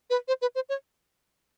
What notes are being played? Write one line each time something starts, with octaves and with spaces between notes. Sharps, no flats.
B4
C5
B4
C5
C#5